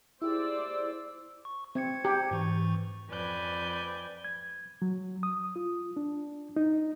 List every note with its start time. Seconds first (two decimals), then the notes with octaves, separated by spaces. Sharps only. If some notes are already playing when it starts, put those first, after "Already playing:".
0.22 E4 G4 G#4 C5 D5 E6
1.45 C#6
1.75 C4 C5 G#6 C#7
2.05 G4
2.31 G#2 E3 C#6
3.11 F2 B4 D5 G#5 G6
4.25 G#6
4.82 F#3
5.23 D#6
5.56 F4
5.97 D4
6.56 D#4